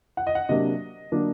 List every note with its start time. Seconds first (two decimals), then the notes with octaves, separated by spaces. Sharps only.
0.17 F#5
0.27 D#5
0.35 F#5
0.49 C3 F#3 A#3 D4 D#5
1.12 D3 F#3 A#3 D4